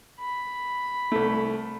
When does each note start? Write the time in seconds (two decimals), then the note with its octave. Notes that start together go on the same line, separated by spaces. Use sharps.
0.20 B5
1.12 C2 A3